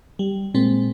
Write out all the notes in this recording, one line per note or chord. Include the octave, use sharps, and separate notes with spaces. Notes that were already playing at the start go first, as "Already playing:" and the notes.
G3
A#2 G#3 C4